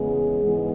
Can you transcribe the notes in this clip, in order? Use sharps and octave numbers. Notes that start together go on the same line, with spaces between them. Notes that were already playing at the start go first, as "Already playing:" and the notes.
Already playing: E2 C#3 G#3 B3 G#4
G#2 E3 G#3 B3